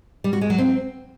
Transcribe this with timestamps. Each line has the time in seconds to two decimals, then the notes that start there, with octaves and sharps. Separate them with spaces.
0.24 G3
0.33 F#4
0.41 G#3
0.50 F#3
0.58 C4